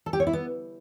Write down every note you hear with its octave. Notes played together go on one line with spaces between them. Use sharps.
A4
G4
C#5
E4
B3